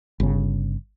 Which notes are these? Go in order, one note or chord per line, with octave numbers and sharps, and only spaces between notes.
G1 C#3